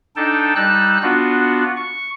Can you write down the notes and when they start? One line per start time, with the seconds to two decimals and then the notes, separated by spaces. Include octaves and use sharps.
0.16 D4 D#4 A4 G5 A5
0.56 G3 D#4 A5 E6 F#6
1.02 B3 D4 F4 F#4
1.77 C#6